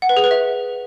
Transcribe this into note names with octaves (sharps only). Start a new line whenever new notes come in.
F#5
B4
G#4
B4
E5